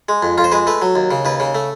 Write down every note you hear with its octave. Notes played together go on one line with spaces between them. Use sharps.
G#3
F2
F2 F4
C5
G#3 B4
A3 B4
F#3
D#2
C#3
D#2 B4
C#3
A3